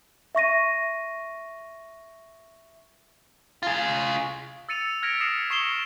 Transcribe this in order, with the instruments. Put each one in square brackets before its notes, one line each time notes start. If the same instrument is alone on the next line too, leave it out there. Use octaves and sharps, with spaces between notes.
[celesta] E5 C#6 A#6 D#7
[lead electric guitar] F4 G#4
[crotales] E6 A6 C#7 D#7 F7
F6 G#6 A#6 B6 D7 F7
D#6 C7 C#7 E7
C#6 C7 E7 G7